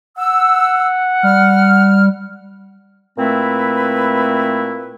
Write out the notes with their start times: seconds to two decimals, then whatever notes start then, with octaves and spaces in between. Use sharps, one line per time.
0.18 F#5 E6
1.23 G3 F6
3.18 A#2 A3 C4 E4 B4